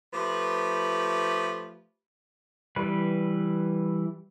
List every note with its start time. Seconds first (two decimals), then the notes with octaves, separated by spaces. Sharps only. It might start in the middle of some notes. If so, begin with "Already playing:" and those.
0.13 F3 A3 G4 B4
2.76 E3 G3 B4